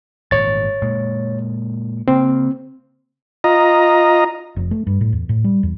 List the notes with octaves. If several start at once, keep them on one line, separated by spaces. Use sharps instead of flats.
G#1 A#2 C#5 A6
A#2 G#3
C#3 A#3 C4
F4 D#5 A#5
F1
A3
G2
A2
E2
A2
G3
E2